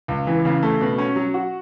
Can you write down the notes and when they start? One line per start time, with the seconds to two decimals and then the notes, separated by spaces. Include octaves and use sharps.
0.08 C#2
0.27 E3
0.45 C#3
0.63 A3
0.81 B2
0.98 C#4
1.16 F#3
1.34 F#4